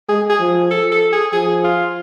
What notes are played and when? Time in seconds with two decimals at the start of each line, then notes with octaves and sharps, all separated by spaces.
0.09 G#3 G#4
0.29 G#4
0.40 F3
0.71 A4
0.92 A4
1.12 G#4
1.33 F3 G#4
1.64 F4